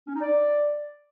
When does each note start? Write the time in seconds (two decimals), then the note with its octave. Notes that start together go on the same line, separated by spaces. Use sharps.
0.07 C#4
0.14 D#4
0.21 D5